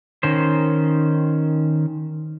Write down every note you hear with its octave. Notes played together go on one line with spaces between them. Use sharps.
D#3 C#4 C5